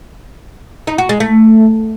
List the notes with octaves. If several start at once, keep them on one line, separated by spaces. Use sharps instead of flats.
D#4
F#4
G#3
A3